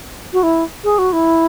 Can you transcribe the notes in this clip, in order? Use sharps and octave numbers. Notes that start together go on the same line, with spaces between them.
F#4
E4
G#4
F#4
E4